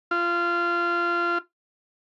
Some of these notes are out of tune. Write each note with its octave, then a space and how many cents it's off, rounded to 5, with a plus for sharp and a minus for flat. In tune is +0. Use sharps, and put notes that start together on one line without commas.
F4 -20